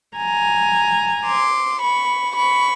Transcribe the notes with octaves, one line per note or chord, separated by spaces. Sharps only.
G#5 A#5
C6 D6
B5 C#6
B5 C#6